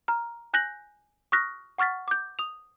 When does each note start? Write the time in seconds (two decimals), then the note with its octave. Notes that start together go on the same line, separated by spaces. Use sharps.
0.08 A#5 F6
0.54 G#5 F#6 G6 A#6 F#7
1.32 C#6 D#6 F6 F#6 A#6 B6
1.78 F#5 C#6 F6 A6 B6
2.08 D6 G6
2.39 D#6 F7